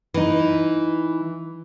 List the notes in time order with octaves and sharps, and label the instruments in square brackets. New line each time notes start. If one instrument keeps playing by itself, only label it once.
[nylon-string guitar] E3 D#4